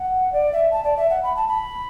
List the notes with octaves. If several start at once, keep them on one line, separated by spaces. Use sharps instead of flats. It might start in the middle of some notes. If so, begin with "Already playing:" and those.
Already playing: F#5
D5
E5
A5
D5
E5
F#5
B5
A5
B5